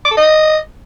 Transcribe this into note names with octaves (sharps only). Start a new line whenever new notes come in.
D6
A4
D#5